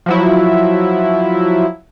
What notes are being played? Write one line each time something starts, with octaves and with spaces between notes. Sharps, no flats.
F3 F#3 E4